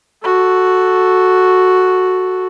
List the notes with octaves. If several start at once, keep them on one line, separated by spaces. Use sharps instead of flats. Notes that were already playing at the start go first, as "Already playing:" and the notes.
F#4 A4